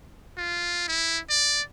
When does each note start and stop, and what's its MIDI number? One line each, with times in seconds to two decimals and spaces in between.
0.37 0.86 65
0.88 1.19 64
1.29 1.62 74